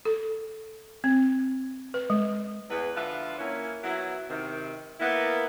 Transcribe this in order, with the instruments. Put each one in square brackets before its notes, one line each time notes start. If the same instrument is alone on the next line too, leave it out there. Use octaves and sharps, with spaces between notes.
[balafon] A4
C4
B4
G#3
[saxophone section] E2 B4
D3 F3 F4 B4 E5 F#5
A#3 C#4 E4
F#3 B3 E4
C3 D#3
A#3 B3 E4